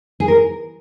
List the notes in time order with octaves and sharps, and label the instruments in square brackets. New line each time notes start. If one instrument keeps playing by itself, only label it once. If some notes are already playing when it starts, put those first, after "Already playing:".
[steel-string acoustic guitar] G#4
A#4